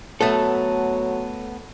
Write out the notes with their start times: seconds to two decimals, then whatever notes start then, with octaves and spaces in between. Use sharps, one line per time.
0.21 F#3 A3 B3 A4